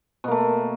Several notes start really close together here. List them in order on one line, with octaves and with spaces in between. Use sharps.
B2 A#3 A3